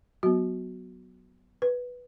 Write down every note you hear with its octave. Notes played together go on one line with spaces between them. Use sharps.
F#3 B3 F#4
B4